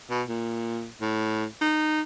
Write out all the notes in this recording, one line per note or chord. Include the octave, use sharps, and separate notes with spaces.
B2
A#2
A2
D#4